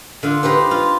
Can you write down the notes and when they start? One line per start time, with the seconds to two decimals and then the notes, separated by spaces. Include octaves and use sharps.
0.23 D3 F4
0.43 D#4 G4 B4 C5
0.71 F4